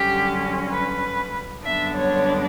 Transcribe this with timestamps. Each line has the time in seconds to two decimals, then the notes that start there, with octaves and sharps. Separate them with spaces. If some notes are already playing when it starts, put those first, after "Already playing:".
Already playing: F#2 D3 G3 C#4 G4
0.72 B4
1.65 F#2 D3 G3 B3 D4 E5
1.96 C#5